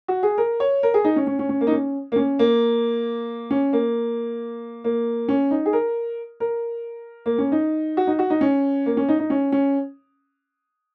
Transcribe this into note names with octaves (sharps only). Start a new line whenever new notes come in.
F#4
G#4
A#4
C#5
A#4
G#4
D#4
C#4
C#4
C#4
C#4
A#3
D#4
C#4
A#3
C#4
A#3
C#4
A#3
A#3
C#4
D#4
G#4
A#4
A#4
A#3
C#4
D#4
F#4
D#4
F#4
D#4
C#4
A#3
C#4
D#4
D#4
C#4
C#4